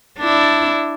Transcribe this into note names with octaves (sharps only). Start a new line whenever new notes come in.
D4 E4